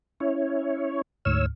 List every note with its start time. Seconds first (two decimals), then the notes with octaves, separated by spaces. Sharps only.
0.20 C#4 E4 C#5
1.25 D2 G#2 C#5 E6 F6